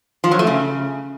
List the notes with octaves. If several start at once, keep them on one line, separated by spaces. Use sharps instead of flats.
F3
F#3
A3
C#3